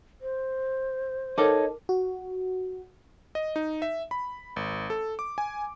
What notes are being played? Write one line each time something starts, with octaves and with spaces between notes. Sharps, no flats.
C5
D#4 A4 A#4 C#5 D6
F#4
D#5
D#4
E5
B5
G#1
A4
D6
G#5